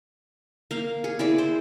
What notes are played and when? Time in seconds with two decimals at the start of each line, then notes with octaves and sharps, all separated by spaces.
0.71 A#3 F5
1.04 G#4
1.19 E4 G#4 D5
1.38 C5